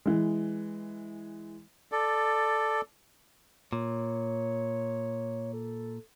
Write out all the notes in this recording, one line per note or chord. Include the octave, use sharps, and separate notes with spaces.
E3 G#3
A4 D5
A#2 C#5
A4